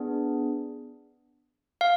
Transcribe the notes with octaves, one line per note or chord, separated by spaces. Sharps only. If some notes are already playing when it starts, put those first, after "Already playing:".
Already playing: B3 D4 G#4
F5